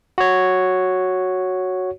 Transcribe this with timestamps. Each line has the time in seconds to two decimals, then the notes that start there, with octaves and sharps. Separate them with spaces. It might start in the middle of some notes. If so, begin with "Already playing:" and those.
0.18 F#4 C#5